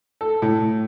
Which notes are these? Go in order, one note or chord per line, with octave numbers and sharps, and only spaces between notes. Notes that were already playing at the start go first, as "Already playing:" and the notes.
A4
A2